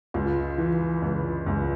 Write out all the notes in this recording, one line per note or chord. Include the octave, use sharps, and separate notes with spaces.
C#2 F4
E3
C#2
C#2